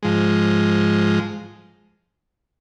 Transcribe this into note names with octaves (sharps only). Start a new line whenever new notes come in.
G#2 F3 G#3